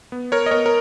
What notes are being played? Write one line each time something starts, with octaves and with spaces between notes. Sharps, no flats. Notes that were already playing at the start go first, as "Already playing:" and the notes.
B3
A#4 C#5
D#5
B3 A#4 C#5
A#4